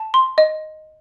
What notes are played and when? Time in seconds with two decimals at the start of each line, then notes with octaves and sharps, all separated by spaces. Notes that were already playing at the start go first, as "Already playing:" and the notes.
Already playing: A5
0.14 C6
0.38 D#5